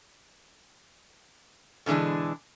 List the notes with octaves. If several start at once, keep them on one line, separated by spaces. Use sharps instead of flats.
B2 D3 E3 G#3 D4